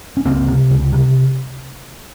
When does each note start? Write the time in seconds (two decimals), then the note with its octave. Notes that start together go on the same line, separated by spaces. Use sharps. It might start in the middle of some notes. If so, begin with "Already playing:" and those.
0.17 C#4
0.25 C#2 A#3 C4
0.47 C3
0.70 C#2
0.92 C3